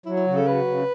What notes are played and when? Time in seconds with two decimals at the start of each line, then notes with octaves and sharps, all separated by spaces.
0.06 F#3 E4
0.17 E4
0.27 C#3 F#4
0.36 A4
0.47 F#3 B4
0.67 C#3